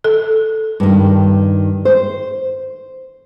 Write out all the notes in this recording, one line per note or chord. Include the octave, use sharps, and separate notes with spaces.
A4
G2 D#3
C5